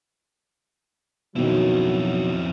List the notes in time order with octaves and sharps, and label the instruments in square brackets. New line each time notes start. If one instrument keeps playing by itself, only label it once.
[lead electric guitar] F2 E4 [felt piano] B2 D#3 C#4 [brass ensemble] F#3